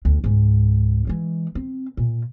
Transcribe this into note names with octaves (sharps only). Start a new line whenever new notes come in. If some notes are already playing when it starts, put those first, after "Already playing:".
D2
C#2 G#2
E3 G#3
C4
A#2